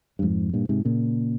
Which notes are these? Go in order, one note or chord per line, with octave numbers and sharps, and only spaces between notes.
G2
F2 G#2
G2 A#2
G#2 C3
A#2 C#3